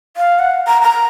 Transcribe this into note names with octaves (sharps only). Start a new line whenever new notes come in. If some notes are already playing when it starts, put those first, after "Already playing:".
F5
F#5
A#5
A#5